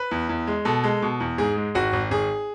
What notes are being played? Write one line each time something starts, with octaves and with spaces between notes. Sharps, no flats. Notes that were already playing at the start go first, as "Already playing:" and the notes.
Already playing: B4
E2
E2
G#3
B2 A4
G#3
B2
E2
G#2 G#4
G#3
G#1 F#4
G#1
G#1 G#4